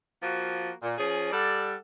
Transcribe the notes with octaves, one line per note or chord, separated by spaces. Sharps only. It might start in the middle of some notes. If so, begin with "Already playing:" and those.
F3 A#3 F#4
A#2
F3 C#4 G#4
G3 A4 D5 F#5